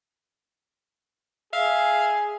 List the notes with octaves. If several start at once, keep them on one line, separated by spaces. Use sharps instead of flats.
G#4 E5 F5